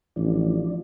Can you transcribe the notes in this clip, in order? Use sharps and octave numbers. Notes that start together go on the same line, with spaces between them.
A1 F3 D4